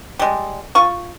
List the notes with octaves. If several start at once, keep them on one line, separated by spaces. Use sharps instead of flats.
G3 G#3
F4 C#6